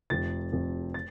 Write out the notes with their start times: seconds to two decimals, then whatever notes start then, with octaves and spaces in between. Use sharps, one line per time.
0.10 F1 F2 C3 A6
0.52 F1 F2 C3
0.94 A6